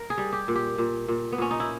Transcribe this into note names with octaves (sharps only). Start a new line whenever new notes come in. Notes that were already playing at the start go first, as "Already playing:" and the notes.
Already playing: A#4
G#4
G3
G4
A#2
G4
A#2
A#2
B3
A#2 C#4
D#4
E4